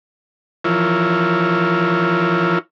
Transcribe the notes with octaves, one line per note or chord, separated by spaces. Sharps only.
E3 F3 E4 F4 A#4 C#5